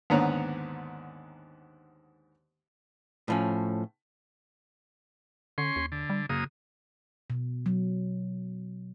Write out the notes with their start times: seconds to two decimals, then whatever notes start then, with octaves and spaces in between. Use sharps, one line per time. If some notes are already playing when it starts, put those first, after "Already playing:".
0.10 D#2 G#2 D3 B3 C#5 A#5
3.28 A2 F3 C#4
5.58 D3 C#4 C6
5.76 D#2
5.92 D3
6.10 G3
6.29 F#2 C#3 A#3 D#6
7.30 B2
7.66 F#3